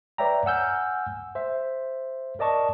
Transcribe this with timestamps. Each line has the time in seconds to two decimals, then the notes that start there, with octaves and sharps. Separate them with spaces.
0.18 B4 C#5 D5 E5 G5 A#5
0.46 F#5 G#5 E6 F6 G6
1.35 C5 E5
2.39 A#4 D5 D#5 A5 C#6